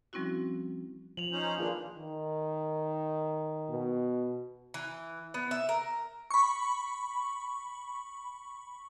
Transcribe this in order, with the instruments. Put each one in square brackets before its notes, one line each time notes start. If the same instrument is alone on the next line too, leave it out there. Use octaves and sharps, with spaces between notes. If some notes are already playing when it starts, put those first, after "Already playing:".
[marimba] F3 G3 C4 C#4 E4 F#4
[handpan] F3 [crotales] F7 F#7
[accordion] C#4 D#4 C5
[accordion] D#3 A#3 D4 [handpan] F4 G#4 B4
[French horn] D#3
[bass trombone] B2
[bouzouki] E3
B3
E5
A#4
[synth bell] B5 C#6